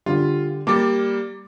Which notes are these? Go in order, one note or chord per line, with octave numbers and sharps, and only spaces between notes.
D3 G3 F4
G3 A#3 D6 A6